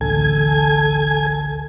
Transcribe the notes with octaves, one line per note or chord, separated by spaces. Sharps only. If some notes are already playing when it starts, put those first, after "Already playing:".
A1 D2 D4 A4 G#5 G#6